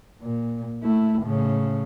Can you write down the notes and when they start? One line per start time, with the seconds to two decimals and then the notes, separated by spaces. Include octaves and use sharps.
0.22 A#2
0.84 A3 E4
1.22 A2 C#3